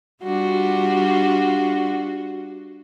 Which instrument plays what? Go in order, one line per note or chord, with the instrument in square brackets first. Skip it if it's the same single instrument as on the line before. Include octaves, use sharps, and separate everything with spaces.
[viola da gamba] G3 D4 F4 [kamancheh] F#4